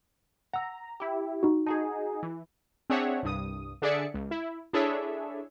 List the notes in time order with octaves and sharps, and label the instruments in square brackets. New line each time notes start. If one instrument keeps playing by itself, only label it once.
[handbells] F#5 E6 [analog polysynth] A#5
[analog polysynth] E4 G4
[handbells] D#4 F#4
[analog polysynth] D#4 F#4 G#4 [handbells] A5
[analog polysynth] E3
[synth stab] C4 D4 G#4 C#5 E5 F#5
C2 G2 D#6
D3 D4 G#4 D5 E5 C#7
C#2
E4
D4 E4 G#4 A4 C#5 E5